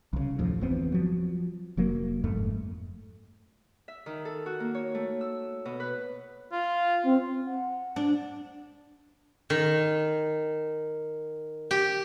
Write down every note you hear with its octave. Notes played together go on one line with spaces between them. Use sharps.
C2 C#3
D#2 A2 F3
G1 E2 B3 C4
F3 F#3
F1 F#3 A#3
F#1 F2 G#2 A3
E5
D#3
A4
F#4
A#3
C#5
A3
E6
B2
B4
F4
C4
F#5
D4
D#3
G4